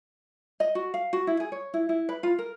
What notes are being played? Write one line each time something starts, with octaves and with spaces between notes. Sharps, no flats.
D#5
F#4
F5
F#4
E4
G#4
C#5
E4
E4
B4
F4
A#4